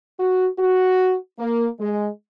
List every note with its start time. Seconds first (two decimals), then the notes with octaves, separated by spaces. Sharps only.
0.19 F#4
0.59 F#4
1.39 A#3
1.79 G#3